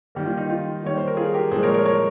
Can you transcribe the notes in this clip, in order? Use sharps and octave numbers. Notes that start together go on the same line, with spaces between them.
D#3 G3 A#3
F4
D#4
F4
D#3 G3 A#3 C#5
C5
A#4
F4 G#4
G4 A#4
A#2 F3 G#3 G#4 C5
A#4 C#5
A#4 C#5
A#4 C#5